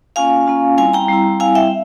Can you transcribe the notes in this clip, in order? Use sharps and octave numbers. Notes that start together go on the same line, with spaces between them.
A#3 C#4 F4 F5 G#5
A#3 C#4 F4
G3 C4 E4 F5 G#5
G5 A#5
G3 C4 E4
G3 C4 E4 F5 G#5
E5 G5